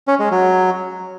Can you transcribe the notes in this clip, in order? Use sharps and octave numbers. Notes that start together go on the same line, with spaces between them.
C#4
G#3
F#3